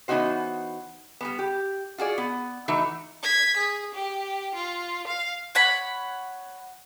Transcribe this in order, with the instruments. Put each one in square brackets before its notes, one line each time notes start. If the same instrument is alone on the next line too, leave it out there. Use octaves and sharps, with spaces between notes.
[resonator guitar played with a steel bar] E3 B3 C#4 D#4 F#4 C5
G3 G#3 B3
G4
F4 F#4 G#4 D5
B3
E3 A3 D#4 F#4
[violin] G#6 B6
G#4
G4
F4
F5
[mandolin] C#5 F#5 B5